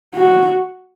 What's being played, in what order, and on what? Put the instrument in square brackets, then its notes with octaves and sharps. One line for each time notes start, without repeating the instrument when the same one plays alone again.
[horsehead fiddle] F#4